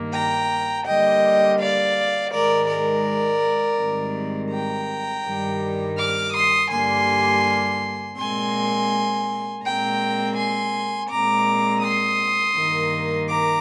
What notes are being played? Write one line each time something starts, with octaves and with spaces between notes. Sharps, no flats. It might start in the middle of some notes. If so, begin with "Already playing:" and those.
Already playing: G2 D#3 A#3
G5 A#5
D3 G3 A#3 D#5 G5
D5 F5
G#2 D#3 G#3 A#4 D5
A#4 D5
G#2 D#3 G3 C4
G5 A#5
G2 D#3 G3
D6 F6
C6 D#6
G2 D3 G3 A#3 G#5 C6
A#2 G#3 C4 G#5 C6
A#2 G#3 C4 G5 A#5
G#5 C6
A#2 G#3 C4 A#5 D6
C6 D#6
G2 D#3 A#3
A#5 D6